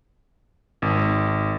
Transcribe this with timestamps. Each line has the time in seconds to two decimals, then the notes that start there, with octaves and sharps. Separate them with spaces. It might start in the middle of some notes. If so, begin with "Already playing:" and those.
0.82 G#1